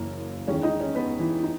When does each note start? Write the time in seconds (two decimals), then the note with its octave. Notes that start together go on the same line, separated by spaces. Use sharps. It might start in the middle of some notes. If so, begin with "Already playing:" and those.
Already playing: F#1 F#2 E3 A#3
0.47 E2 D#3 G#3 C#4 C#5
0.63 D#4 D#5
0.80 C#4 C#5
0.95 B3 B4
1.20 E3 E4
1.43 D#4